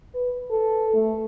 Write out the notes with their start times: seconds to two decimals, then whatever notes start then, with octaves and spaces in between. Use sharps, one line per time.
0.14 B4
0.51 A4
0.94 A3